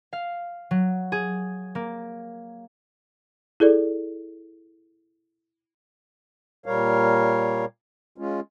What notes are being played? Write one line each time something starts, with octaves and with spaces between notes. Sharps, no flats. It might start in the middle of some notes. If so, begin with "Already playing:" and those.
F5
F#3
G#4
A#3
E4 G#4 A4 D5
A#2 G3 A#4 C#5 F5
G#3 C#4 F4